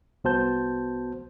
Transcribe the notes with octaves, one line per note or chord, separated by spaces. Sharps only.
C2 B3 F#4 C5 A5 G6